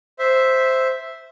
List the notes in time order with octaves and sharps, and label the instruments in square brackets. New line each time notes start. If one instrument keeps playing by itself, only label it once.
[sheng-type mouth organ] C5 E5